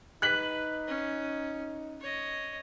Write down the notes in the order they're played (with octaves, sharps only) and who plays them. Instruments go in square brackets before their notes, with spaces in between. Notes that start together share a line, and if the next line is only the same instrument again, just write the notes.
[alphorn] D#4 [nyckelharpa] B4 [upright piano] F#6 B6 F#7
[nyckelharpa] C#4
C#5 D#5